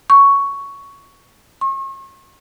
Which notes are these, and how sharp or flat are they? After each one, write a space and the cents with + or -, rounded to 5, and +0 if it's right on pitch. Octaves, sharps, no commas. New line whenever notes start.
C#6 +5
C#6 -40